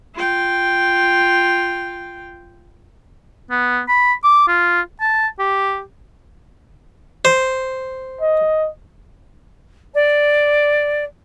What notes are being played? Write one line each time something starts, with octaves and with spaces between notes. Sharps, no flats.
F4 G5
B3
B5
D6
F4
A5
G4
C5
D#5
D5